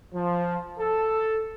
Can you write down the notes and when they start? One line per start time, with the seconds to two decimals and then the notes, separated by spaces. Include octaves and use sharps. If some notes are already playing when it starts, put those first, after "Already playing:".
0.14 F3
0.78 A4